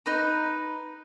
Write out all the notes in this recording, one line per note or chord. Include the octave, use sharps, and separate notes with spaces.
D#4 B4 A#5